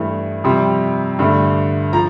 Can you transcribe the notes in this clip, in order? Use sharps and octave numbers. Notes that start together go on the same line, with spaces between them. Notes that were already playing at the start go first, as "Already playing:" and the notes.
Already playing: G2 E3 A3
F2 C3 G3 C6
G2 D3 A3
F3 A#5